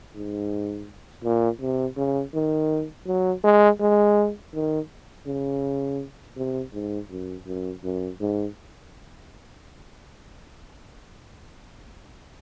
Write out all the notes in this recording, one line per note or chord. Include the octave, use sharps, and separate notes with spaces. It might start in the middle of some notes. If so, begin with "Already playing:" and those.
G#2
A#2
C3
C#3
D#3
F#3
G#3
G#3
D#3
C#3
C3
G#2
F#2
F#2
F#2
G#2